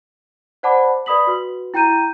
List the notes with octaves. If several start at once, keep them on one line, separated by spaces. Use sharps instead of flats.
C5 D5 F#5 A5 B5 D6
B4 D5 B5 D#6 B6 F#7
F#4 B4
E4 G5 A#5 G6 D#7